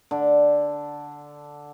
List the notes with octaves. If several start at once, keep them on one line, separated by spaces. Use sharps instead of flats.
D3